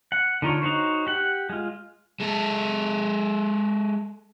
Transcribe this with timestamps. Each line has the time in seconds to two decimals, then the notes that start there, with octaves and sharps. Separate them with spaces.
0.12 F#5
0.42 D3 D#4 F4 C#5
0.62 D#4 F#4 C5 C#5
1.07 G4 F#5
1.49 G#3 F4
2.20 G#3 A4